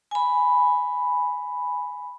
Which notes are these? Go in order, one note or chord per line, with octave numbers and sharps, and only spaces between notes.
G#5 B5